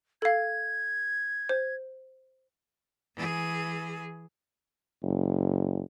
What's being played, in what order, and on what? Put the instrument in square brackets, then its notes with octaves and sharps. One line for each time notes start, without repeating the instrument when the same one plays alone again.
[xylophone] A4 F5 [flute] G#6
[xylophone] C5
[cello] E3 G#4
[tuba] F#1